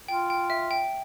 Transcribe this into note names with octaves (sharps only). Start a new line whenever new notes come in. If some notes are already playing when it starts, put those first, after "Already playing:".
F4 G5
G5
E5
G5